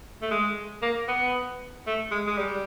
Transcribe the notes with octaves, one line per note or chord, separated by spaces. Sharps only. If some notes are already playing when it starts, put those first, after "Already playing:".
A3
G#3
A#3
B3
A3
G#3
G#3
G3